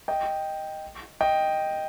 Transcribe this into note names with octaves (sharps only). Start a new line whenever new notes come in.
D#5 G5
D#5 G5